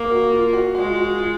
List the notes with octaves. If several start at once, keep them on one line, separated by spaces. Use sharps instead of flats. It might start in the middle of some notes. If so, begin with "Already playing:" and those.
Already playing: A#3
F#4
F4
F#4
G#3 F#4
F4
F#4
F4